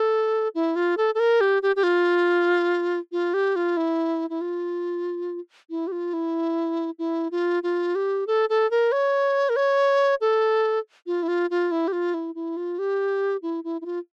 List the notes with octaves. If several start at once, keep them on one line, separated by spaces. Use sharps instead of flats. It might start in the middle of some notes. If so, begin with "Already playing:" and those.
Already playing: A4
E4
F4
A4
A4
A#4
G4
G4
G4
F4
F4
G4
F4
E4
E4
F4
E4
G4
F4
E4
E4
F4
F4
G4
A4
A4
A#4
C#5
A#4
C#5
A4
F4
E4
F4
F4
E4
G4
F4
E4
E4
F4
G4
E4
E4
E4
F4